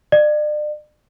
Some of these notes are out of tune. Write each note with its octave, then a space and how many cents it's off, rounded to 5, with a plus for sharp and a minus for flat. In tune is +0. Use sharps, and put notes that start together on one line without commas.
D5 +40